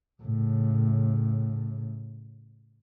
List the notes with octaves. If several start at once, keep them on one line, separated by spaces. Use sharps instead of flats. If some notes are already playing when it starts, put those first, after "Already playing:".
A2 C#3